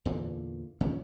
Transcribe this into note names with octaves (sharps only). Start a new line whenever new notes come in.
E2 A#2 D3 E3
D#2 A#2 D#3 C#4